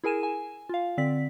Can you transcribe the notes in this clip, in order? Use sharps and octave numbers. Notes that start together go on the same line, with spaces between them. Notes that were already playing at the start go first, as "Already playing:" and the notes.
E4 G#4 A#4 G#5 D#7 E7
G#5
F4 F5
D3 C4 D5 B6